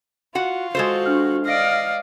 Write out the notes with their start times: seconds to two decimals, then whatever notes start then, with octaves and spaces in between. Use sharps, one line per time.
0.35 F4 F#4 F#5
0.75 G#3 F#4 A4 C5
1.06 D4 F6
1.46 D5 D#5 F5 F6 A#6 D7